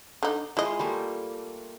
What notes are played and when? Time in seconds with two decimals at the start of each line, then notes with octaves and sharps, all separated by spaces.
0.23 D3 D#4
0.57 G#3 E4 F4 D#5
0.79 G3 A3 A#3